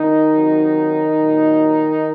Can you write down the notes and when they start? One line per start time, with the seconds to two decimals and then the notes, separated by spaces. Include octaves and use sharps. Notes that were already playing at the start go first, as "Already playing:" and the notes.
Already playing: D#3 D#4
0.34 C3 F#3
1.19 A#2 F#3